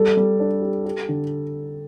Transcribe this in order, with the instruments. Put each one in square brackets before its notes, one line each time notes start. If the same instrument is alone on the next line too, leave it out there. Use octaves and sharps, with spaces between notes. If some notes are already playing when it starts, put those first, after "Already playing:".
Already playing: [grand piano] G3 [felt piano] A4
[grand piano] G3
D4
G4
G4
D3